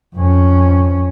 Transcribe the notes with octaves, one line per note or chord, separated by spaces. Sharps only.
F2 C#4